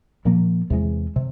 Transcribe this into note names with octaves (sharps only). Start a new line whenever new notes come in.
A#2 F3 A#3
E2 C3 E3 G#3
C3